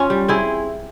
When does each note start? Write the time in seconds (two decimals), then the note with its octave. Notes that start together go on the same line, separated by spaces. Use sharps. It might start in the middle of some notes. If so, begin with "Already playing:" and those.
Already playing: C#4 F4
0.10 G3
0.28 C4 E4 G#4